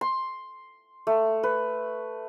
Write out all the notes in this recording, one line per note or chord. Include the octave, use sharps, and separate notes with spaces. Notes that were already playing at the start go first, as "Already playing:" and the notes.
C6
A3
B4